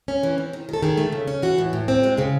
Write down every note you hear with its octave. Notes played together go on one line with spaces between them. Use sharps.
C#4
E3
C4
D#3
D#3 A4
D#3 G#4
A3
C#3
C#4
E3 F#4
A2
A2
C4
G#3 F#4
C#3 G#4